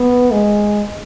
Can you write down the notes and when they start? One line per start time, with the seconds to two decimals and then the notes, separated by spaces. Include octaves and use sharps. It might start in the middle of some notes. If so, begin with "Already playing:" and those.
Already playing: B3
0.31 G#3